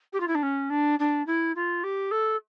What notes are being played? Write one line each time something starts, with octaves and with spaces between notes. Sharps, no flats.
G4
F4
E4
D4
C#4
D4
D4
E4
F4
G4
A4